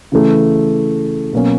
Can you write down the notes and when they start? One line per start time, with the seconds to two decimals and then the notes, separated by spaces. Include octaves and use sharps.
0.12 C#3 E3 A3
1.33 B2 F#3 A#3 C#4